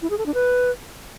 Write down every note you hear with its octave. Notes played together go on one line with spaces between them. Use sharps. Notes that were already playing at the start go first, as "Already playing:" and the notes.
E4
G#4
A4
D4
B4